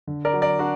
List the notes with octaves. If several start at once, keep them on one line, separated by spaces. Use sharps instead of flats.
D3
A#4 D5
F#3
A#4 D5
D4 F#4